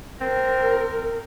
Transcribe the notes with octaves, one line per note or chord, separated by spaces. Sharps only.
C4 A#4